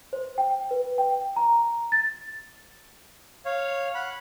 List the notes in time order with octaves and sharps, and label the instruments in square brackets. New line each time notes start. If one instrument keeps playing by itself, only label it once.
[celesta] C5
G5
B4
G5
A#5
A6
[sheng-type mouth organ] C#5 F5
F#5 B5